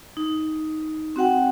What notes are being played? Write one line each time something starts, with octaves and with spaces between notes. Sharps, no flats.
D#4
C4 F#4 F#5 G5